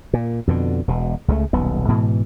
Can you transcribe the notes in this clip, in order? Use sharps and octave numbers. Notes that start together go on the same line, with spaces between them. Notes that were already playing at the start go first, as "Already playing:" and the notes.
A#2
F2 B2 D3
E1 B2
C#2 C#3 F3 A3
D#1 B1 B3
G#2 B2 E3